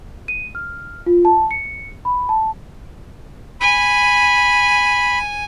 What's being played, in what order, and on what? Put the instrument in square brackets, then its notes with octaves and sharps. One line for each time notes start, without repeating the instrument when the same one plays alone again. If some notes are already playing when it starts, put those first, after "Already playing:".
[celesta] D#7
F6
F4
A5
C#7
B5
A5
[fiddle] G#5 [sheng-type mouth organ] B5